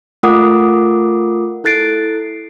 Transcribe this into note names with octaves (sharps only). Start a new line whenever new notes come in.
A3 F4 A#4 F#5 D6 D#6
E4 A4 F#6 A6 C7 D7